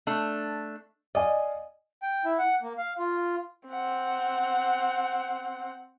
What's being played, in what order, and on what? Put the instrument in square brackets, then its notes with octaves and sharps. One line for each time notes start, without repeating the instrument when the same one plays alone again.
[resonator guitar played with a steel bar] A3 D4
[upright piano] D5 F5 G#5 [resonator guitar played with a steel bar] D#5
[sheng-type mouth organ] G5
E4
F#5
A#3
F5
F4
[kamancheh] C4 F#5